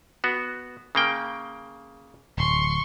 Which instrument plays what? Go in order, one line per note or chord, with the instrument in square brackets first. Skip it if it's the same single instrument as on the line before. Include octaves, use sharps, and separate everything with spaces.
[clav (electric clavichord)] B3 F#4
C#3 A#3 G5
[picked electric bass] D1 [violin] C6 C#6